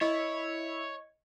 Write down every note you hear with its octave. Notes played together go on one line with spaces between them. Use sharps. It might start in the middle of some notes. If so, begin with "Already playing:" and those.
E4 C#5 D#5